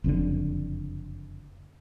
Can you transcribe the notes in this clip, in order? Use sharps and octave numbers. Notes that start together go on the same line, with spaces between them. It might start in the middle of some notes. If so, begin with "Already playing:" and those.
F#1 F2 A2 D3